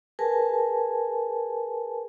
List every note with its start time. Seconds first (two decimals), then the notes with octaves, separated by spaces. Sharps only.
0.19 G#4 A#4 B4 G#5 A5